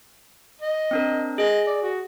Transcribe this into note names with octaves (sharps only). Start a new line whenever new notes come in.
D#5
C4 D4 A#4
G#4 D#5
D5
F#4